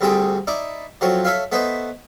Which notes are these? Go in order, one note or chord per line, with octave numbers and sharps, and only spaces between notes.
D2 G2 C4 G#4 A4 G5
D#4 E4 D5
F3 F#3 A3 C4 C#5
A4 C#5 E5 F5
A3 B3 B4 C5 D#5